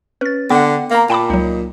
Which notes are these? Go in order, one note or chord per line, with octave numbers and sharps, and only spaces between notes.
C#4 B4 A6
D3 B3 F#5 G5
A#3 F5 A#5
A#2 G5 A5 B5 D6
C#2 F#3 D#4